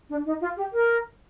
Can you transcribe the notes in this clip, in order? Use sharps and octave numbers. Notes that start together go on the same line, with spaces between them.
D4
D#4
F4
G4
A#4